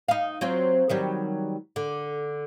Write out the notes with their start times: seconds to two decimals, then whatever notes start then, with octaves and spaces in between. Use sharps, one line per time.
0.08 D#4 F5
0.41 F#3 C4 F4
0.89 D#3 F#3 G3
1.76 D3